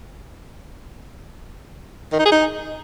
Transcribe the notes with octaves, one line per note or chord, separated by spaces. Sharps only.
D#3
D#4
G#4
D#4